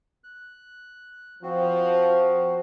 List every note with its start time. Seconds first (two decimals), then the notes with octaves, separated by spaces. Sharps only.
0.24 F#6
1.43 F3 C4 F#4 C5